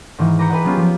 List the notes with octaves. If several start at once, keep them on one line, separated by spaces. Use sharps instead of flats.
G#2 D#3 E3
B4 A#5 D6 G6 A#6 C#7
G#4 B4 D#5 F#5
F#3 B3 C#4 F4 G4
F3 B3 D6